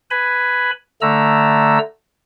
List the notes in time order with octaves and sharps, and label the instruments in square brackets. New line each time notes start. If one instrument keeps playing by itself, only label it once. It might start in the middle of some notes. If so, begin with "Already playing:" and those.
[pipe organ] B4 G#5 B5
D3 A3 A#5 E6